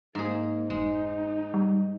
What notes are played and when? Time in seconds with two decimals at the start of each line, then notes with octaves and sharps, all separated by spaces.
0.15 G#2 A#3 G#4
0.70 F1 G#3 D#4
1.54 G3